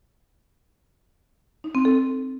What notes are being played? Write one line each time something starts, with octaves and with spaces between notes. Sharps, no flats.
D#4
C4
A4